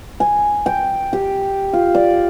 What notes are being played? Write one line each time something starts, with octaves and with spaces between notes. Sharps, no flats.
G#5
G5
G4
F4
D5